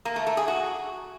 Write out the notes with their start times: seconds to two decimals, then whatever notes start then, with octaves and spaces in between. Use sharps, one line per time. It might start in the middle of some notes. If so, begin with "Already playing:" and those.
0.05 A#3
0.16 A3
0.27 A3
0.37 G#4
0.48 F#4